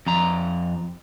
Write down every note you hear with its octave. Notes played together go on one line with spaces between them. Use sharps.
F2 A#5